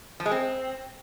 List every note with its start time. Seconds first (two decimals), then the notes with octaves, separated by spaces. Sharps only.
0.20 F3
0.26 G#3
0.31 C4